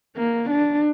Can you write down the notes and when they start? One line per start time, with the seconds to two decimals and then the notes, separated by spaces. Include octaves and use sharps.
0.17 A#3
0.50 D4